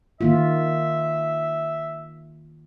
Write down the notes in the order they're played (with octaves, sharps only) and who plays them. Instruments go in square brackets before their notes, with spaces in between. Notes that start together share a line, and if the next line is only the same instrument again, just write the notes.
[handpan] D#3 A#3 F4 [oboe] E5